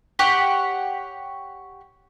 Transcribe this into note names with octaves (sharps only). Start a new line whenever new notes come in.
G4 C#5 F#5